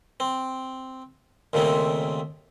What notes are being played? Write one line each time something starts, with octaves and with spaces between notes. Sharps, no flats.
C4
D#2 A#2 C#3 A3 C4